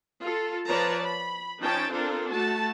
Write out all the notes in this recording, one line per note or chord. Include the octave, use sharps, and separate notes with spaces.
F4 A4
F3 B4 C#5 D5 A5 A#5
B5
F3 C#4 D#4 G5 A5
C4 D4 F4 A4 A#4
A3 F#4 A5